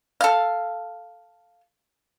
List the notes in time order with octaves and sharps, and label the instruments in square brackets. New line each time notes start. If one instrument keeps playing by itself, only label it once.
[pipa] A4 F5